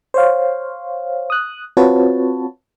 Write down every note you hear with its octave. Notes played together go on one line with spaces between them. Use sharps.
C5 C#5 F5
D#6 F#6
C4 F4 F#4 B4 C#5 A5